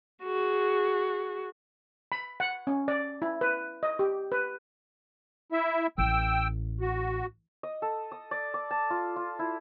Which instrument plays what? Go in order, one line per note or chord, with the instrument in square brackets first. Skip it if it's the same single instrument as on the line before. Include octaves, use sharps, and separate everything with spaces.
[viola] F#4 G#4
[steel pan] B5
F#5
C#4
D5
E4
B4
D#5
G4
B4
[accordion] E4 E5
[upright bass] A1 [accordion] G5 E6
[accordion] F#4
[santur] D#5
A4
D#6
D5
D6
A5
F4
F4
E4